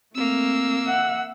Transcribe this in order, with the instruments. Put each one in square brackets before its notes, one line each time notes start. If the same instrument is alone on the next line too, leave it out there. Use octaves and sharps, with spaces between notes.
[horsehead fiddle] A3 [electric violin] A#3 E6 [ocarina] C4
[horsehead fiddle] E5 F#5